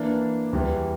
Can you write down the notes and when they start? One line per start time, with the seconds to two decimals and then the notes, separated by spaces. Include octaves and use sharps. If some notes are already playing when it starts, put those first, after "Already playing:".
Already playing: E3 A#3 D4
0.53 E2 E3 G3